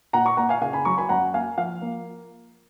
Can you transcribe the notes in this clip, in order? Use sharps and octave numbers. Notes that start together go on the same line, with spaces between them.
A#2 F#5 A#5
A#5 C#6
A#2 F#5 A#5
F5 G#5
C#3 F5 G#5
G#5 B5
F#3 A#5 C#6
G#5 B5
F#2 F#5 A#5
A#3 F5 G#5
F3 F5
A#3